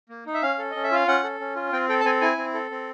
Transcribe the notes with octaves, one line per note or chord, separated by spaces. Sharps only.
A#3
D#4
E5
C#4 F5
A4
C#4 D#5
E5
F4 F5
C#4 F#5
A4
C#4
F4
C4 G5
A4 G5
A5
C4 G#5
E4 G#5
C4
A4
C4